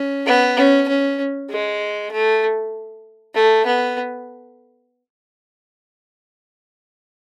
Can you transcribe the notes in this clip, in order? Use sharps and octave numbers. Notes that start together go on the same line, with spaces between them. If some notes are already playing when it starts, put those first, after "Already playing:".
Already playing: C#4
B3
C#4
C#4
G#3
A3
A3
B3